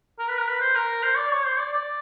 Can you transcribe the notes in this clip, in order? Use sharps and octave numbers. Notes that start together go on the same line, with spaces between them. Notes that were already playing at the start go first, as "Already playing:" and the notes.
A#4
B4
A#4
B4
C5
A#4
C5
D5
C#5
C5
D5
D5